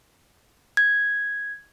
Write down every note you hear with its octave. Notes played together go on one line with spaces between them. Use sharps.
G#6